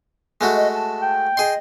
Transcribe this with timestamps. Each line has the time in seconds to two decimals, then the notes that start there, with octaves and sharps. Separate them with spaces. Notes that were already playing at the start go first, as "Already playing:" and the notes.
0.41 G#3 A3 F#4
0.56 D#5
0.74 A5
1.02 G5
1.37 G#4 D#5 C6